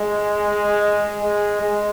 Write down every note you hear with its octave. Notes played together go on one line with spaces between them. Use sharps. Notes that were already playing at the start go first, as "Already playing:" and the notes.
Already playing: G#3
G#3
G#3